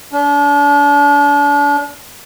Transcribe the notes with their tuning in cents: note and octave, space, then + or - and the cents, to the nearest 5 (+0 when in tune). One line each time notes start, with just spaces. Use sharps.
D4 -35